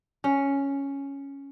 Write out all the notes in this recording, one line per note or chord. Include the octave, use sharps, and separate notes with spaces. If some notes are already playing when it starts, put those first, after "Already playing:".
C#4